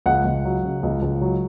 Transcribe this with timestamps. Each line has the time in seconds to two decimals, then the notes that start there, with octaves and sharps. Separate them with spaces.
0.06 C#2 F#5
0.25 C#2
0.45 F#3
0.64 C#3
0.83 C#2
1.02 C#2
1.21 F#3